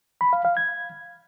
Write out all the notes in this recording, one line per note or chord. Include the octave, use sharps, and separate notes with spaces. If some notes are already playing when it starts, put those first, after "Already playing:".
B5
F5
F5
G#6